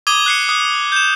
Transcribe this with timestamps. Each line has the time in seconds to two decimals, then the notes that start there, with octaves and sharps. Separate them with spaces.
0.07 D6 D#6 G#6 D#7 G7
0.26 F#6 C7 C#7
0.49 D#6 F#6
0.92 G6 E7